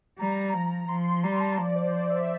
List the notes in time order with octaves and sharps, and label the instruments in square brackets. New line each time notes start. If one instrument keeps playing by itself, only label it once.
[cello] G3 [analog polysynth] A#5
[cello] F3
[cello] F3 [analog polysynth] C6
[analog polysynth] C6
[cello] G3 [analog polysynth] A#5
[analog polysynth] A5
[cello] F3 [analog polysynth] D5
[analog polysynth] C5
D5
E5